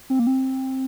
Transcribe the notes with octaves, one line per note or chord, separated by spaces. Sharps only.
C4
A#3
C4